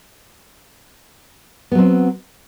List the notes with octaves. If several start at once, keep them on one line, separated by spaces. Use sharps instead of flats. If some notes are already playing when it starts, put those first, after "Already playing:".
F#3 B3 C4